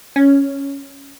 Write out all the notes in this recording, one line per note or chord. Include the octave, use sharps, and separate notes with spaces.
C#4